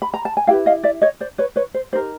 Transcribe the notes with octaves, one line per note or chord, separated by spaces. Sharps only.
B5
A#5
A5
G#5
E4 G4 B4 F5 G5
D#5 F5
D5 E5
C#5 D#5
C5 D5
B4 C#5
B4 C#5
C5
D#4 G4 A#4 C5